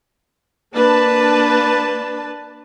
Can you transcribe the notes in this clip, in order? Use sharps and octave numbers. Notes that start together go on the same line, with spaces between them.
A#3 D4 B4 A5